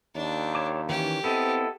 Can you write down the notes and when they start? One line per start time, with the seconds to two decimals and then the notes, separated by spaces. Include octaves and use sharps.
0.16 D#2 D4
0.55 C#5 A5 D6
0.89 D#3 E3 C#4 G4
1.24 B3 C4 E4 A4 D#5